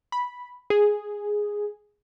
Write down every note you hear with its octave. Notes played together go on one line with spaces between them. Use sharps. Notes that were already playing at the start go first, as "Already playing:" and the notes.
B5
G#4